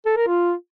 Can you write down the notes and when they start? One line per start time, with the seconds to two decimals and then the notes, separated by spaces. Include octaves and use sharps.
0.06 A4
0.17 A#4
0.27 F4